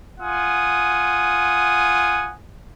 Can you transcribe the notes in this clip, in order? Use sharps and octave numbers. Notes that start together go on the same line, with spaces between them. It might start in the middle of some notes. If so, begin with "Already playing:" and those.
F4 F#5 G#5 D#6